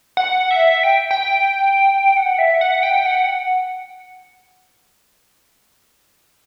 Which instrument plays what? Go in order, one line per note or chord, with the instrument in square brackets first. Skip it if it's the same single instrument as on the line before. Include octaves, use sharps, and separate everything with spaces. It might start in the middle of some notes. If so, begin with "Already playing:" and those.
[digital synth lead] F#5
E5
G5
G5
F#5
E5
F#5
G5
F#5